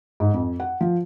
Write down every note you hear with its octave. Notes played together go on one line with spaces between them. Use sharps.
G#2
F2
F#5
F3